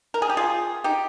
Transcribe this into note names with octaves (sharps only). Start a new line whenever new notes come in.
A#4
G#4
G4
F4 G#4
D#4 G4